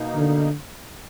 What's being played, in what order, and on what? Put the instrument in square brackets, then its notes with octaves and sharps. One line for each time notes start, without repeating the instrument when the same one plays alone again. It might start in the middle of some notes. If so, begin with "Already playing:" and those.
Already playing: [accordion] B2 A#3 D#4
[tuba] D3